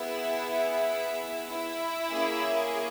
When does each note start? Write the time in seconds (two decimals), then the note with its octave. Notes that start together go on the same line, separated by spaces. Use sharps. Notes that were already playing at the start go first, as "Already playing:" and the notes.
Already playing: B3 E4 G#4 E5
1.47 E4 E5
2.12 A#3 C#4 G#4